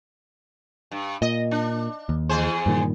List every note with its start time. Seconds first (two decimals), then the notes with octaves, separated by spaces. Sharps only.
0.91 G2
1.22 A#2 D#5
1.51 D4
2.09 D#2
2.29 E2 G#4 C5
2.66 G2 A#2 D#3